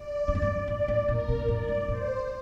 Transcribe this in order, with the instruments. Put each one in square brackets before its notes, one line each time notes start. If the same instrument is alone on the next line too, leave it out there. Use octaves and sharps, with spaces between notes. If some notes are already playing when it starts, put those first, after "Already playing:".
Already playing: [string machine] D5
[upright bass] G2
F2
G2
[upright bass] A2 [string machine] D5
[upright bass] A2
[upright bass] A#2 [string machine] A#4
[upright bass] C3
A#2
[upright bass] A2 [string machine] D5
[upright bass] G2
[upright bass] A2 [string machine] C5